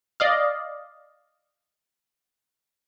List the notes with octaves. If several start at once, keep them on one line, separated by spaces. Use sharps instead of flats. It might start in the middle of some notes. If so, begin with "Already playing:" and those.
D5 D#5 F5